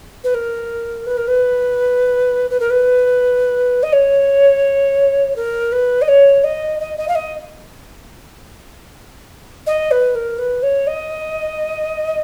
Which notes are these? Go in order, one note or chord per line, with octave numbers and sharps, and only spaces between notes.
B4
A#4
B4
A#4
B4
B4
A#4
B4
D#5
C#5
A#4
B4
D#5
C#5
D#5
D#5
D#5
F5
D#5
D#5
B4
A#4
B4
C#5
D#5